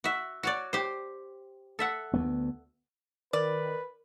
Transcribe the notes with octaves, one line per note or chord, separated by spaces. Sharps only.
F#4 E5
F#4 C#5 D5
G4 C5
A4 E5 F#5
D2 A#3 B3
D#3 A#4 B4 D5